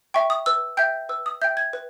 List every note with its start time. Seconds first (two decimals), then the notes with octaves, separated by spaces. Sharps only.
0.14 E5 G5 C#6
0.30 D#6
0.46 B4 E6
0.77 E5 G5 G6
1.09 B4 E6
1.26 D#6
1.42 E5 G5 G6
1.57 G#6
1.73 B4